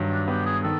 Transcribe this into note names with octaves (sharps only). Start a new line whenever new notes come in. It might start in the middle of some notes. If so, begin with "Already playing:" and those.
Already playing: G2 D#3 F#3
D4
B3 G4
G#4
D#3 A4